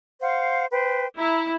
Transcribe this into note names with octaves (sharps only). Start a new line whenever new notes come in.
C5 F5 F#5
B4 C5 G5
E4 A#5